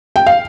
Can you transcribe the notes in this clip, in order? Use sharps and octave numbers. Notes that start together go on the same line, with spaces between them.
G5
F5